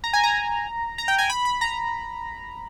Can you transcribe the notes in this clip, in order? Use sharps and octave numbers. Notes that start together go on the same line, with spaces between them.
A#5
G#5
A#5
A#5
G5
G#5
B5
B5
A#5